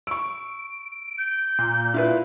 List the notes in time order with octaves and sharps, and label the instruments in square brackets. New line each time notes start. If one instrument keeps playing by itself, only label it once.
[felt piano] C#6 E6 [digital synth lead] D7
[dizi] G6
[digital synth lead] A#2
[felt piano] E4 F4 B4